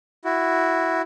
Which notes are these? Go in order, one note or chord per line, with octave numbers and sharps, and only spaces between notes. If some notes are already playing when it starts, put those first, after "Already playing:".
E4 F#4